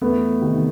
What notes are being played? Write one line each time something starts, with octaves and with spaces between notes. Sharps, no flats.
E2 A3 B3
C3 D#3